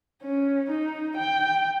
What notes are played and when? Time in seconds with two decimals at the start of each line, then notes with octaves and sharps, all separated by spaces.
0.23 C#4
0.70 D#4
1.17 G5